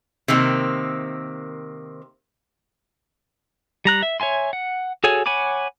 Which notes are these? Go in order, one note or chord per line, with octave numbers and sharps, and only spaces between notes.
C3 D#3 A#3 C4
G3 A#5 F#6
E5
C#5 E5 G#5 C6
F#5
F#4 G#4 A4 C#5 G#5
C#5 F#5 G#5 B5 D6